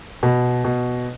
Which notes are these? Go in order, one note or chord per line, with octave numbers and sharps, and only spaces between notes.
B2
B2